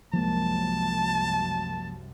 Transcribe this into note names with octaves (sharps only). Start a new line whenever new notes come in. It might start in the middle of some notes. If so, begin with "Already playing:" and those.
C2 F#2 F3 G#3 A#3 A5